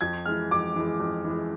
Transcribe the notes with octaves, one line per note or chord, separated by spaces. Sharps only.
F2 G#6
E3 G#3 F6
F2 D6
E3 G#3
F2
E3
G#3